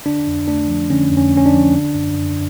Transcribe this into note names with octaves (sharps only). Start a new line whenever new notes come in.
D3 D4
F2
A3 D4
F3
D3 C#4
F2
C#4
A3
C#4
D4
F3
D3
F#2
F#2